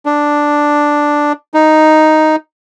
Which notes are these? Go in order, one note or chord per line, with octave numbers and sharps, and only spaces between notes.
D4
D#4